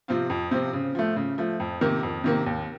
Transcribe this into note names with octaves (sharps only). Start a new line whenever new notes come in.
C3 F3 C4 F4
F2
C3 F3 C4 F4
C#3
F3 A3
C#3
F3 A3
F2
C3 D#3 A#3
F2
C3 D#3 A#3
D#2